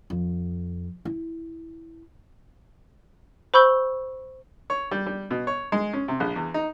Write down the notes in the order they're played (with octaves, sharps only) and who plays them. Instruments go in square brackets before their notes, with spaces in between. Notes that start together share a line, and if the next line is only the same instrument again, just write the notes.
[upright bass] F2
E4
[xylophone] C5 B5 C#6 E6 G6 G7
[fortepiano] C#5
G3
G3
B2
C#5
G#3
C#4
C3
A#1
E2
D#4